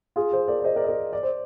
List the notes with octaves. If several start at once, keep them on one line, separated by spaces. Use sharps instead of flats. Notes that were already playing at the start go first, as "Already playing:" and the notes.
F4 G#4
G#4 C5
A#4 D5
D5
C5 D#5
A#4 D5
D#5
A#4 D5
D5
C5